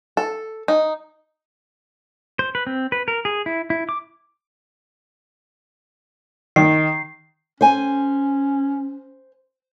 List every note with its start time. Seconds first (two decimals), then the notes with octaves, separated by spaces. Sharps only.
0.17 A4
0.68 D#4
2.39 C5
2.55 B4
2.67 C4
2.92 B4
3.08 A#4
3.25 G#4
3.46 E4
3.70 E4
3.89 D6
6.56 D#3 C7
7.61 C#4 C5 G#5